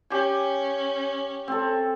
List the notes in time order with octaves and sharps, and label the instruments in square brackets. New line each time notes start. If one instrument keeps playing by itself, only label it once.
[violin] C#4 [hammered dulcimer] G4 G#5
[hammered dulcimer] C4 A4